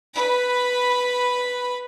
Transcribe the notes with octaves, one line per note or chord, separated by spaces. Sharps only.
B4 B5